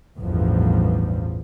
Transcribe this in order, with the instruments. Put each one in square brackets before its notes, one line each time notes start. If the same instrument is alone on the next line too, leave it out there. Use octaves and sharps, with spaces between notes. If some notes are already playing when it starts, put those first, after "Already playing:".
[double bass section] A1 E2 G2 F3